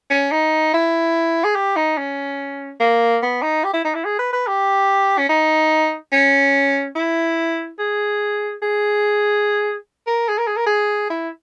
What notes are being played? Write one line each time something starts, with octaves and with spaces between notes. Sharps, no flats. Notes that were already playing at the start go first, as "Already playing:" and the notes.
C#4
D#4
E4
G#4
G4
D#4
C#4
A#3
B3
D#4
G4
E4
D#4
E4
G#4
B4
B4
G4
C#4
D#4
C#4
E4
G#4
G#4
A#4
G#4
A#4
G#4
A#4
G#4
E4